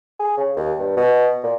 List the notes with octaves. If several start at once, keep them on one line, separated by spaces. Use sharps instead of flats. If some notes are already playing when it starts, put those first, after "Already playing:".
G#4
C#3
D#2
G2
B2
A#2